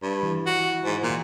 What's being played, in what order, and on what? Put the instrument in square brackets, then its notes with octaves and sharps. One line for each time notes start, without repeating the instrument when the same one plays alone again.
[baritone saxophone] G2
[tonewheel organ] E3
[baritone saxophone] F#4
G#2
A#2